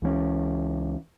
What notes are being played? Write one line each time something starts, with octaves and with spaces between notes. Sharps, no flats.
C#2 E3 G3 C#4